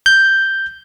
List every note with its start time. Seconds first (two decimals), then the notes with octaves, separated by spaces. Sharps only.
0.06 G6